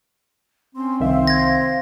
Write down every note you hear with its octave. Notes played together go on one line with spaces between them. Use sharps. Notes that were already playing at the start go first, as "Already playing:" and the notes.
C4 C#4 C6
C2 D#3 C5 E5 F5 C6
G#6 A#6